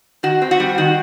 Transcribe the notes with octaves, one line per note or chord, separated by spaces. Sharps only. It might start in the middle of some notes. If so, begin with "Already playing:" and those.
D#3 F#4
C4
F#4
G3
D#3 F#4